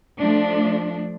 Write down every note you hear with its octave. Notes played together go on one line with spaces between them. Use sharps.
F3 A3 D4